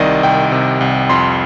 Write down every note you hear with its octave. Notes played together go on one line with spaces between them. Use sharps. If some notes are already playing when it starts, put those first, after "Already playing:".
Already playing: C2 C3 D#3 D5 D#5
C2 G5
C3
C2
F2 C6